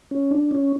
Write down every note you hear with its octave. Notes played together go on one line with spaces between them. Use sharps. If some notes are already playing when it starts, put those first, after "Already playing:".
C#4
D4
C#4